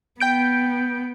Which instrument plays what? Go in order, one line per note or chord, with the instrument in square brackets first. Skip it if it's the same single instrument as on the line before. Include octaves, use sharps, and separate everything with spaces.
[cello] B3 [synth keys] G5 G6 D7